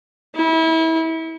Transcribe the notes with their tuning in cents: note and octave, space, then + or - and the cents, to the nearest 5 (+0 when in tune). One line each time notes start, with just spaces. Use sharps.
E4 -30